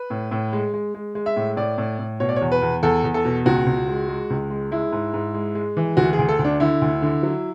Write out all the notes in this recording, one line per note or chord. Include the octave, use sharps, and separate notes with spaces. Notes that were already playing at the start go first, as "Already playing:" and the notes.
Already playing: B4
A2
A2
G#3
G#3
G#3
G#3
E5
A2
A2 D5
A2
A2
B2 C#5
D5
E2 C#5
B4
E2
E2 A4
E2
A4
B2
C#2 F#4
C#2
G#3
G#3
C#2
G#3
G#3 E4
G#2
G#2
G#3
G#3
E3
D2 F#4
G#4
D2
A4
D2
D4
D3 E4
D2
D3
F#3